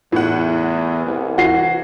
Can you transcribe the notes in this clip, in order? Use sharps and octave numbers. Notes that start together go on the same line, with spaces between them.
E2 A2 F#5
C2
E3 F#4 C7